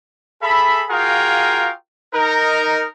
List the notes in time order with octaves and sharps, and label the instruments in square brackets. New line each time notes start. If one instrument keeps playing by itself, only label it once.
[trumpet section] G#4 A4 E5 B5
F4 F#4 G#4 A#4 F5 G5
D#4 A#4